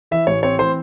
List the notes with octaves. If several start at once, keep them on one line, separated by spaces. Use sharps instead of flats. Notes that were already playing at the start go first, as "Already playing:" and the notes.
E3 E5
A1 C#5
C4 C#5
E3 C5